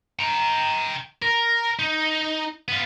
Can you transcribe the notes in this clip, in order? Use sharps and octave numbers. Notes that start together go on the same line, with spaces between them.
G5 A#5
A#4
D#4
B3 F4